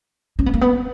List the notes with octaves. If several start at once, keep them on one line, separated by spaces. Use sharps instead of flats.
C#4
B3
A#3
B3